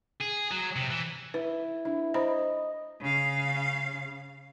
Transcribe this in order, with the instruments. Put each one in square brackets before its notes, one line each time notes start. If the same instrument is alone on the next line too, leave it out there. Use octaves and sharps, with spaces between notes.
[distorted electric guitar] G#4
F#3
C3
E3
[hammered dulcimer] E4 [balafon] B4
[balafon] D4 [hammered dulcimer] E4
[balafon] C5 A#5 B5 [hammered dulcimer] D#5
[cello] C#3 F5